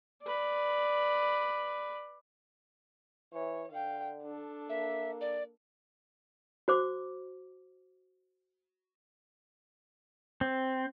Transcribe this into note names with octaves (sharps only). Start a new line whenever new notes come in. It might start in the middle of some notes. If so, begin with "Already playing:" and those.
B4 D5
E3 C#5
D3 F5 G5
D4 A4
A#3 E5
D5
F#4 C5 D6
C4